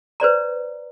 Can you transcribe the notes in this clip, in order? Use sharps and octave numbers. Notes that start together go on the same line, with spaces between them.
B4 C5 D5 A#5